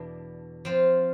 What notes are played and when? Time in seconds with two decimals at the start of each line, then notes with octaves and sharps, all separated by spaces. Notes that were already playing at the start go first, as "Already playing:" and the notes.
Already playing: E2 B2 B3 D4
0.65 F3 C4 F4